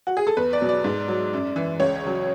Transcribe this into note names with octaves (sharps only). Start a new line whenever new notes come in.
F#4
G#4
A4
E2 B4
D5
B2 F#3
D5
G#2
F#3
F#2
E3
C#2 C#5
C#3 F#3